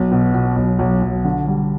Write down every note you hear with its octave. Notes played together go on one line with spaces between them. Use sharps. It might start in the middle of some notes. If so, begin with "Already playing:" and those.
Already playing: B1
B2
B2
B1
B1
B1
D3
G3